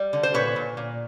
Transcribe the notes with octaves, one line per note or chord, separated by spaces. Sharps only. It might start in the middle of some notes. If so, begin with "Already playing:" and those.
Already playing: G3
D3
C5
A#2 B4 C#5
A#2
A#2